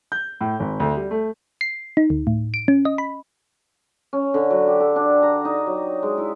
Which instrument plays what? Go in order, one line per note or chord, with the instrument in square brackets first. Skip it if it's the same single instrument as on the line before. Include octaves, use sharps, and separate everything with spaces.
[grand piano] G6
A2
G#1
D2
G3
A3
[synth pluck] C7
D#4
D2
A2
D7
C#4
D#5
B5
[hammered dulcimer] C#4
D3
F#3
G4
A4
D4
A#5
D#4
F#3
G#3
E4